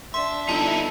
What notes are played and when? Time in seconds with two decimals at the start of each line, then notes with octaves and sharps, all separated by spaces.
0.14 D4 E5 C6
0.49 G1 D#4 E4 A5